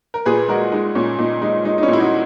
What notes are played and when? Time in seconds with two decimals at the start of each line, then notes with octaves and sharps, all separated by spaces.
0.14 A#4
0.26 A#2 G#4 B4
0.48 G#3 F#4 A#4
0.72 G#3 D#4
0.95 A#2 C#4
1.18 A#2 D#4
1.42 G#3 D#4
1.64 G#3 D#4
1.78 D#4
1.82 C#4 E4
1.88 A#2
1.93 E4
2.00 D#4 F#4